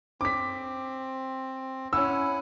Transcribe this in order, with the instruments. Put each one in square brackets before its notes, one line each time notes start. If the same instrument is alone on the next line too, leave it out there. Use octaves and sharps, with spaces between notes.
[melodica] C4 [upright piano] D6 B6
[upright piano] C#4 E6 [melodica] E4 F#5 G#5